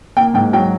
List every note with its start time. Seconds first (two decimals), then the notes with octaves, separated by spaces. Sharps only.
0.17 A#3 G5
0.34 G#2 G5
0.53 F#3 G5